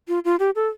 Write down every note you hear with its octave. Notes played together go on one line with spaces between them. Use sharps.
F4
F4
G4
A4